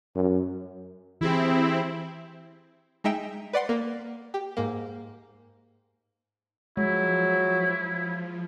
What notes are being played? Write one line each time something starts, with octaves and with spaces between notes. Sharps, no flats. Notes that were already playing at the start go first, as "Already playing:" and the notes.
F#2
E3 C4 E4 G4 G#4
G#3 D#4 E5 G5
B4 D5 F#5 C6
A#3
G4
G#2 A#3
F3 F#3 G#3 E4